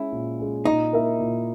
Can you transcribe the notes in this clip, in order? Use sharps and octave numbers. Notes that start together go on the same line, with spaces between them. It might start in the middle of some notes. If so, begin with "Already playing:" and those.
Already playing: G#3 C#4 E4
A#2
G#3 C#4
A#2 D#4
A#3 E4 A#4 E5
A#2